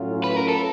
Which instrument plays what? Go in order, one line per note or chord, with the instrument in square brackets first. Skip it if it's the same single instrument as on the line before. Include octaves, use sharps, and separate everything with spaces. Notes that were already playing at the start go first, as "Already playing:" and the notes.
Already playing: [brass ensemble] A2 F#3 A3 C#4 F4
[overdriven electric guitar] B4
A#4
A4